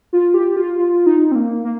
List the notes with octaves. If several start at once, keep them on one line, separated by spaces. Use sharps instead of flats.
F4
G4
F4
F4
D#4
C4
A#3
A#3